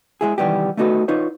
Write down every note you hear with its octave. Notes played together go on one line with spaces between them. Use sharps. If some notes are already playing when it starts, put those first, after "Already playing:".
G#3 E4 G#4
C2 D#3 E3 G3 B3 G4
A3 B3 D#4 F#4 A4 B4
D#4 F4 B4 C#5